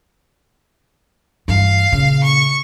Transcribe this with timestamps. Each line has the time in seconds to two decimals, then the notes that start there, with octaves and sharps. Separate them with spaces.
1.48 G2 E3 F5
1.92 A#2 C#3
2.24 C#6